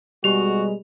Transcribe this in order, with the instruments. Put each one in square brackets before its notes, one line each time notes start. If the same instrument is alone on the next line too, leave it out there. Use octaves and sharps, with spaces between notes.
[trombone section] B2 G#3 [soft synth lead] G3 [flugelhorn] F#4 [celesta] G4 F7